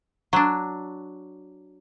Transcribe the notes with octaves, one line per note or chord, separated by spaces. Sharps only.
F#3 D4